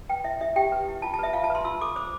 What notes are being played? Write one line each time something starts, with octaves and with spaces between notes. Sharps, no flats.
B4 G5
E4 E5
E4 E5
G4 G5
B4
E4
F4 A5
A5
B4 E5
F4 F5
A5
B4 C6
F4 E6
A4 D6
C5 D6